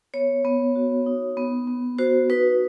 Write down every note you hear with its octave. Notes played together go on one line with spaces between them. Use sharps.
B3 C#5
B3
F#4
D#4
B3
B3
F#4 C5
D#4 B4